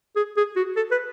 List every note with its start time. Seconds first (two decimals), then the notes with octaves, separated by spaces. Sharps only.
0.16 G#4
0.37 G#4
0.56 F#4
0.76 A4
0.91 B4